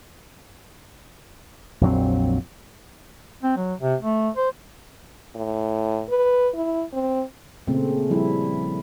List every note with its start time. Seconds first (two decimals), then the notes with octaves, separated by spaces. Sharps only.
1.81 A#1 F2 F#3 C4
3.43 C4
3.57 F#3
3.80 C3
4.01 A3
4.36 C5
5.35 A2
6.09 B4
6.55 E4
6.93 C4
7.67 A#2 C#3 A3 C4
8.10 F3 G3 E4